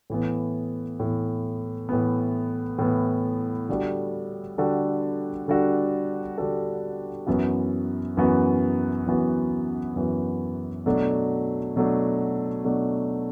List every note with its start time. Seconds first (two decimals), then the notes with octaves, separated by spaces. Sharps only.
0.10 A2 E3 B3
1.00 A2 E3 B3
1.89 A2 E3 B3
2.78 A2 E3 B3
3.69 D3 G3 D4 F#4 A4
4.58 D3 G3 D4 F#4 A4
5.48 D3 G3 D4 F#4 A4
6.38 D3 G3 D4 F#4 A4
7.27 F#2 E3 B3 F#4
8.17 F#2 E3 B3 F#4
9.06 F#2 E3 B3 F#4
9.96 F#2 E3 B3 F#4
10.86 B2 F#3 A3 D4
11.76 B2 F#3 A3 D4
12.64 B2 F#3 A3 D4